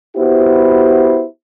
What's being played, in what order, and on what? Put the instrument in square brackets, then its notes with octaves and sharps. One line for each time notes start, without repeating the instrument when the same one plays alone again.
[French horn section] B3 E4 F#4 G4 C5